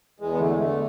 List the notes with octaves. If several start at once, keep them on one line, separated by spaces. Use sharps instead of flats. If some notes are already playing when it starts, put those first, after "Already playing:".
E2 G#3
B3
D3 A3
G#3
D3 A3